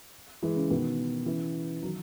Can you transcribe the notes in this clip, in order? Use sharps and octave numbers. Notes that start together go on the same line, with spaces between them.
E3 G#3
C#3
B2 D#3
C#3 E3
D#3 F#3